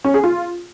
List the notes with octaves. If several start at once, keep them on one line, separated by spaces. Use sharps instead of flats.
C#4
G#4
F4